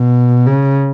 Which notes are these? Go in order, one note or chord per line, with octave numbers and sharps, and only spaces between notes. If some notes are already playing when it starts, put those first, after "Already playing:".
Already playing: B2
C#3